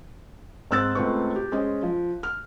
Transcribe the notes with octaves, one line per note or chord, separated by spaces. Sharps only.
G#2 C4 E6 F#6 A6
C#2 A3 C4 B4 C#6
G4
G#3 C#4 C5 D#5
F3
F6